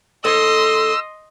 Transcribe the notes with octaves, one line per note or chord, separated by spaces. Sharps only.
D#2 A4 C#5 D#5 C6 E6